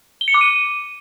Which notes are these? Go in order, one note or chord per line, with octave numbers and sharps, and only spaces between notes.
G7
C#7
D6
D#7